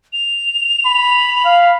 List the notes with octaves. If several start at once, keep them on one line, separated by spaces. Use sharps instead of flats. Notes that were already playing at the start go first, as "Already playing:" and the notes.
F7
B5
F5